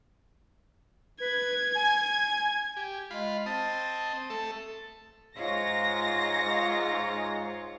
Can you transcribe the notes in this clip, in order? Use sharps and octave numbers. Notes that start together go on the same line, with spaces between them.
B4 G#6
G#5
G4
G#3 F4 B5
C4 D#5 A5
A3 A4
G#2 F4 C#5 A#6